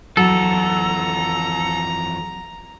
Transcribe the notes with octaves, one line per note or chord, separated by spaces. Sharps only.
F2 E3 F#3 A4 A#5